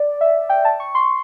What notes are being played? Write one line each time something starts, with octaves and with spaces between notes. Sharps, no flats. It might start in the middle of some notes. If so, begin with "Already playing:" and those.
Already playing: D5
E5
G5
A5
C#6
C6